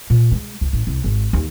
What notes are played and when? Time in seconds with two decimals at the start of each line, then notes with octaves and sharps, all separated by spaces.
0.10 A#2
0.31 G#3
0.61 C#2
0.73 A1
0.87 C2
1.04 G#1
1.33 D#2